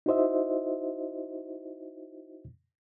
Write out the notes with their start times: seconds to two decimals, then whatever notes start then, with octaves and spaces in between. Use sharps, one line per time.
0.06 D#4 E4 F#4 C5 D#5 E5